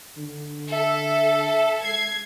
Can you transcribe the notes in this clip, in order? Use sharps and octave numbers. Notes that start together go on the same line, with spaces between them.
D3
A4 E5
G#3 G#6 C7